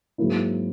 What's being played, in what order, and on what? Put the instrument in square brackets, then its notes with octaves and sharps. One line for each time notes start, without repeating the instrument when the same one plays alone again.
[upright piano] G#2 F#3 A#3 E4